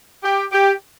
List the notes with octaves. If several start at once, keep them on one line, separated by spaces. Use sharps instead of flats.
G4
G4